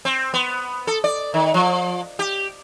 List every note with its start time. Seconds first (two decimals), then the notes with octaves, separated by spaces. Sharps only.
0.05 C4
0.34 B3
0.87 A4
1.04 D5
1.34 D#3
1.54 F3
2.19 G4